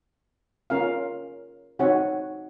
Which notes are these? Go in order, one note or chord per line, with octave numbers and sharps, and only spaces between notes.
C#4 F4 A#4 F5
C4 D#4 F#4 C#5 F#5